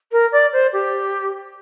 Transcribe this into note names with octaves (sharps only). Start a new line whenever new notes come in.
A#4
D5
C5
G4